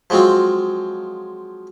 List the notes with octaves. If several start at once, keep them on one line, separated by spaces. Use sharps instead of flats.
F3 F#3 G#3 C4 F4